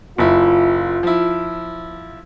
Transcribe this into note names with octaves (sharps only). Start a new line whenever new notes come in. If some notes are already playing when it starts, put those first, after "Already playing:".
F#1 E4 F4
F3 E4